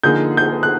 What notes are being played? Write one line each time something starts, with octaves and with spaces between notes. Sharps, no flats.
D3 F3 A#3 D#4 G#4 G6
G6
F#6